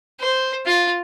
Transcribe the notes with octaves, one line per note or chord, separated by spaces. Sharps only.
C5
F4